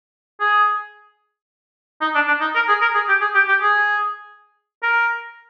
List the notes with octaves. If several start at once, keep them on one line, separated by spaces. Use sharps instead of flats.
G#4
D#4
D4
D4
D#4
A#4
G#4
A#4
G#4
G4
G#4
G4
G4
G#4
A#4